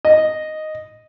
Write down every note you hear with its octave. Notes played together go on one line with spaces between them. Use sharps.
D#5